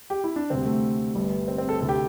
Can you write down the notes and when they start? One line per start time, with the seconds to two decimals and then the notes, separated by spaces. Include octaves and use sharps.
0.10 G4
0.24 E4
0.36 D4
0.50 D2 C3 G3 C4
0.66 A3
1.15 G1 G2 G3
1.48 C4
1.58 C4
1.69 A4
1.80 D2 C3 A4
1.89 G4